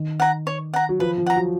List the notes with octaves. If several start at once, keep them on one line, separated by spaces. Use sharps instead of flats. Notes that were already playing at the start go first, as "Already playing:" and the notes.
Already playing: D#3
F#5 A#5
C#5
F#5 A#5
F#3
F3 B4
F3
F#5 A#5
F#3